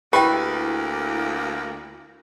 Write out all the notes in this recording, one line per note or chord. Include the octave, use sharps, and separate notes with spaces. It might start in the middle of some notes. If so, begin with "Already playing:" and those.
D2 A#3 E4 G4 B4 G5